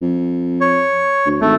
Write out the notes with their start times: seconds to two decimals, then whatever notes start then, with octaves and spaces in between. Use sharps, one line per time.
0.02 F2
0.61 C#5
1.26 D2
1.41 G#1 A3